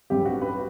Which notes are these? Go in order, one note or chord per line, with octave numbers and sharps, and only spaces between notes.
A1 G2 E3 G3 C4 G4
F#4
B4